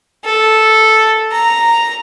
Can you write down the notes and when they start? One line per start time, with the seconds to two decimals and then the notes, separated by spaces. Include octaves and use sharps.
0.25 A4
1.32 A#5